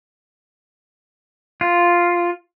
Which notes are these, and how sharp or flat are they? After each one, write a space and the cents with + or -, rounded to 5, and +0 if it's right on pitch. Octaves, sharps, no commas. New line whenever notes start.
F4 +0